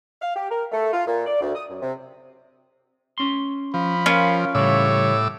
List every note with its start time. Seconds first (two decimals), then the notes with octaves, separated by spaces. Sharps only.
0.22 F5
0.35 G4
0.50 A#4
0.72 A3
0.92 F4
1.07 A#2
1.26 D5
1.41 D2
1.55 D#6
1.69 F#2
1.82 C3
3.18 C#4 C6
3.74 F3 B5
4.06 C#4 F4 A#4
4.55 A2 C#3 E3 G3 C#5 D6 E6